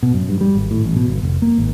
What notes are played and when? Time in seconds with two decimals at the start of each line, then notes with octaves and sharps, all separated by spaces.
0.03 B2
0.14 F#2
0.29 G2
0.41 G3
0.55 G#1
0.71 A2
0.84 A1
0.96 B2
1.08 G1
1.23 F1
1.42 A#3
1.58 G#1